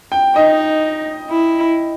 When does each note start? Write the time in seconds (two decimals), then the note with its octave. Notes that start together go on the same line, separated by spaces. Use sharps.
0.12 G5
0.35 D#4 D#5
1.31 E4